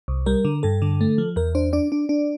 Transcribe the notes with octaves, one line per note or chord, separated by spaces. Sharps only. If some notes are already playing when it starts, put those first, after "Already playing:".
C2
G3 A#4
D3
G2 A4
D3
A3
F3
E2 A#4
D4 C5
D4 D5
D4
D4